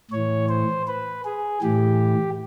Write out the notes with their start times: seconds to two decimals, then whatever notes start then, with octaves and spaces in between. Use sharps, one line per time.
0.11 A2 E3 C#5
0.49 C5
0.87 B4
1.25 G#4
1.62 A2 E3 G4